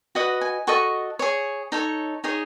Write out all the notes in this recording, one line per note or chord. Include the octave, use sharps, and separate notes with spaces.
F#4 B4 D#5 F#5
G#5
F#4 A4 D#5 C#6
G#4 C#5
D#4 A4 C#5
D#4 G#4 C#5